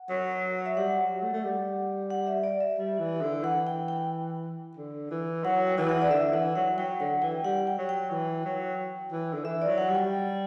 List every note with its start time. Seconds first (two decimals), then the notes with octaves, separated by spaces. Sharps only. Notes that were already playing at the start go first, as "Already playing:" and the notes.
Already playing: F#5
0.10 F#3
0.66 E5
0.77 G3 F#5
1.00 F#3
1.22 A3
1.33 A3
1.44 G3
2.10 F#5
2.27 E5
2.44 D5
2.60 E5
2.78 G3
2.99 E3
3.22 D3
3.43 E3 F#5
3.67 G5
3.88 G5
4.77 D3
5.11 E3
5.44 F#3 F#5
5.66 G5
5.78 E3
5.89 F#5
6.02 D5
6.11 D3 E5
6.33 E3 F#5
6.55 F#3 F#5
6.78 F#3 G5
7.00 D3 F#5
7.22 E3 G5
7.44 G3 F#5
7.67 G5
7.78 F#3
7.89 G5
8.11 E3
8.45 F#3
9.12 E3
9.33 D3
9.44 E3 E5
9.62 D5
9.67 F#3
9.78 F#5
9.90 G3 G5